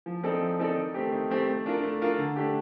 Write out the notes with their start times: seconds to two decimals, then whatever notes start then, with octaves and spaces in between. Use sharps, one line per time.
0.06 F3
0.23 C4 D#4 A4 D5
0.41 F3
0.59 C4 D#4 A4 D5
0.76 D#3
0.94 A3 C4 G4
1.12 D#3
1.30 A3 C4 G4
1.47 A3
1.66 D4 F4 A#4
1.83 A3
2.02 D4 F4 A#4
2.18 D3
2.36 A3 D4 G4